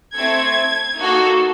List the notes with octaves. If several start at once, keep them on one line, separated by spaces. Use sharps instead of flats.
A3 C4 E4 A4 G#6
A#3 D#4 F#4 A4